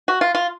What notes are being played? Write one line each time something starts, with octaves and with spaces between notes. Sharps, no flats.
F#4
F4
F4